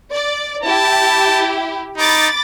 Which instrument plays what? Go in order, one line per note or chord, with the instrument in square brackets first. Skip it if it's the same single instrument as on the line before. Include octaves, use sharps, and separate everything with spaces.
[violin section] D5
[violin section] E4 G4 [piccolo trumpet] A5
[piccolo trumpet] D#4 [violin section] B5 D6 A6